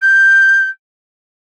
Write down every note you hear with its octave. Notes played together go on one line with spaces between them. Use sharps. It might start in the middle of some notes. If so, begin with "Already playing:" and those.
G6